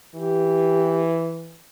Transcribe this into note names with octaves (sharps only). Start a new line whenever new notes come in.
E3 G4